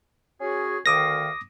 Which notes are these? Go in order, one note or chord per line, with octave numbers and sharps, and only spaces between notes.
C#4 F#4 G#4
D2 D#3 F5 D6 D#6 A#6